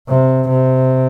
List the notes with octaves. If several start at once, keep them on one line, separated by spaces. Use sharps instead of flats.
C3
C3